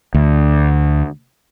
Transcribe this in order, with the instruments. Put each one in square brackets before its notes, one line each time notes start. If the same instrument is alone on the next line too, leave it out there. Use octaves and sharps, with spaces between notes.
[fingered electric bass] D2